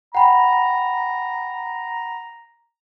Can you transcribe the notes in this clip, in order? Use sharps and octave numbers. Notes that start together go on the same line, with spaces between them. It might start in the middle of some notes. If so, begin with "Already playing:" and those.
F#5 G5 A#5 B5